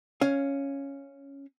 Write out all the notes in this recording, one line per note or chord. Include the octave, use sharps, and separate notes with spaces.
C#4 F5